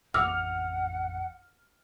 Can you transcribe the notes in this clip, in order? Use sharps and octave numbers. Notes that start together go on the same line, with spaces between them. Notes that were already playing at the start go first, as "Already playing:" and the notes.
A1 F2 E3 F#5 D6 E6 F6